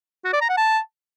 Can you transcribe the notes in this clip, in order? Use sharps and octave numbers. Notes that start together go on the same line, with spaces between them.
F#4
D5
A#5
F#5
A5